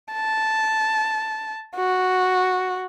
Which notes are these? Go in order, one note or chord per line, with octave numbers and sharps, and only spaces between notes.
A5
F#4